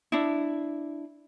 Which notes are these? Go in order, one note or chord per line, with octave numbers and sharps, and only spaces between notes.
D4 E4